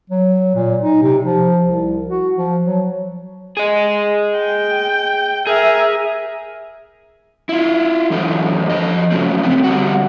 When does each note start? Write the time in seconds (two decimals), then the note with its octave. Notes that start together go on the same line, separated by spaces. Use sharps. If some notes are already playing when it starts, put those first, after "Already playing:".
0.10 F#3
0.55 A#2
0.82 D#4
1.02 C3
1.25 F3
1.65 C2
2.08 F#4
2.37 F3
2.65 F#3
3.57 G#4 D#5
4.38 G5
5.47 G#4 A#4 E5
7.49 E4 F4
8.10 F#2 E3 D4 A4 C5
8.70 F3 C5 D#5
9.11 C#3 F3 F#3 G#3 A3 C4
9.43 B3 C4
9.64 D3 G3 F#4